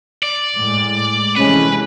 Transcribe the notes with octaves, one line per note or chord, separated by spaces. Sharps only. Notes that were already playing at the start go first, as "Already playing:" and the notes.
D5
A2 G#3
C3 E3 G#3 A3 C#4 B4